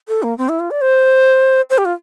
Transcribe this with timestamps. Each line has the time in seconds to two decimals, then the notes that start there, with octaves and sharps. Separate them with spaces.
0.08 A4
0.23 A#3
0.38 C4
0.49 E4
0.59 F4
0.71 D5
0.81 C5
1.70 C5
1.78 G4
1.85 F4